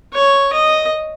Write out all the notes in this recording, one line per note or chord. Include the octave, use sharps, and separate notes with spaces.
C#5
D#5